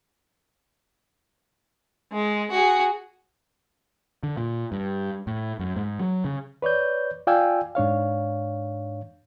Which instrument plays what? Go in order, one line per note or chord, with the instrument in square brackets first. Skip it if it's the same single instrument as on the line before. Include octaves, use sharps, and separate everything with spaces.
[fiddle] G#3
F#4 G#4
[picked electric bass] D3
A#2
G2
A2
F#2
G#2
F#3
C#3
[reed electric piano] B4 C#5 D5 G6
F4 D5 F5 G5 G#5 E6
G#2 D4 C#5 F5